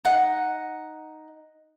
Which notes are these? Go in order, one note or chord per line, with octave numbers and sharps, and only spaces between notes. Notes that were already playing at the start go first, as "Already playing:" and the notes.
D#4 F#5